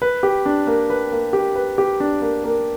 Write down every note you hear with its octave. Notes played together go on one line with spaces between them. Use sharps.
B4
G4
D4
A#3
B4
A#3
G4
B4
G4
D4
A#3
A#3